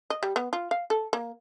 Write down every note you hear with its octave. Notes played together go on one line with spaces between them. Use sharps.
D#5
G3
B3
F4
F5
A4
A#3